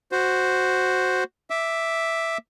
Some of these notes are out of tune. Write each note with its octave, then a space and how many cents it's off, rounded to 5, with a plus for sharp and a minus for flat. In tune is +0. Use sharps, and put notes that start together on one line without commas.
F#4 +0 C5 +0
E5 +0 D6 +0